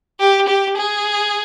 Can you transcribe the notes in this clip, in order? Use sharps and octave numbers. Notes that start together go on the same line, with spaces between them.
G4
G4
G#4